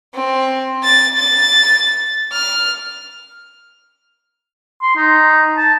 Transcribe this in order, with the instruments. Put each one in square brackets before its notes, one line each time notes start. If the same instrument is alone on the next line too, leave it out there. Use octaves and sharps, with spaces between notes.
[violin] C4
A6
A6
F6
[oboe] C6
D#4
A5